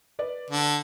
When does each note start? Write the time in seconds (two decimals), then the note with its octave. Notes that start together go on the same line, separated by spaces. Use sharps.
0.19 B4 D5
0.50 D3